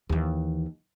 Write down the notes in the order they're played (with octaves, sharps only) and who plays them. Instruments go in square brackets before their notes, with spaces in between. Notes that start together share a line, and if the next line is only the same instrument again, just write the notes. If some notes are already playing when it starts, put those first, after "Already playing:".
[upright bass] D#2 E3